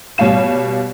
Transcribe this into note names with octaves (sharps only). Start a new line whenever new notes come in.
B2 G3 C#5 F5 E7